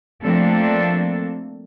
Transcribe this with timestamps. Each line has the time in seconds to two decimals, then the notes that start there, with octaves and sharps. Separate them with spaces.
0.22 F3 A3 A#3 C4 D4 A4